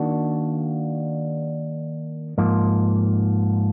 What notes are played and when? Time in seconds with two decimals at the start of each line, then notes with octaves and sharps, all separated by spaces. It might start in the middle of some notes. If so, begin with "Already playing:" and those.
Already playing: D#3 A#3 D4 F#4
2.38 G#2 F3 A#3